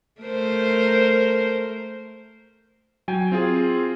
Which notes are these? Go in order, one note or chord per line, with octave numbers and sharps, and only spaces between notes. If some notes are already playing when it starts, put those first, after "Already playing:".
A3 A#4 C5
F#3 G5 G#5
C4 F4 G#4